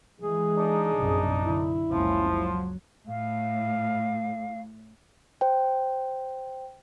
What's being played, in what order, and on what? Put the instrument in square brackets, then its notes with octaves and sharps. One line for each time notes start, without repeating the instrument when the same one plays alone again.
[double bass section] E3 G#3 [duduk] G#4
[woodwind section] D4 D#4
[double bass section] A#1 F#2 C3
[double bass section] D3 [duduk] E4
[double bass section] F#1 C#2 C#4 [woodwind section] F3
[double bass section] F#3
[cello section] A2 [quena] F5
[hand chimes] C5 G5